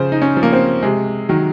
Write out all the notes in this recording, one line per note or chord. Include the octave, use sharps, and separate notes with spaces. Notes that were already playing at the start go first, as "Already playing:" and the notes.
Already playing: C#3 F3 C5
D#4
C#4
F3
A#3
C4
C3 G#3
D#3 F#3